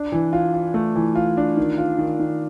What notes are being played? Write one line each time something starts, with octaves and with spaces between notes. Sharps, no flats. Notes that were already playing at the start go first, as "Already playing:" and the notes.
Already playing: D4
E3
F4
F4
A3
E3
F4
D4
D#3
F4
D#3
D#3